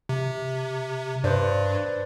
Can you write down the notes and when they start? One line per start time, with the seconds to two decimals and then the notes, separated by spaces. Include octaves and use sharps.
0.09 C3
1.24 G2 B4 C5 D5